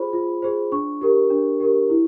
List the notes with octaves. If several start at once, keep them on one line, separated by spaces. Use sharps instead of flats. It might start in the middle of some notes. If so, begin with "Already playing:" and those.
Already playing: F4 G#4 C5 B5
F4
G#4 C5
D4 C#6
G4 A#4
D4
G4 A#4
E4